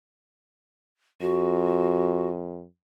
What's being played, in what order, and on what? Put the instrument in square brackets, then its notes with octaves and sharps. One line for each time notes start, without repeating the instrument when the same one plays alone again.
[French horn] F2 [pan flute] F#4